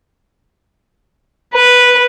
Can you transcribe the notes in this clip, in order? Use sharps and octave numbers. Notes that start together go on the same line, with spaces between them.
B4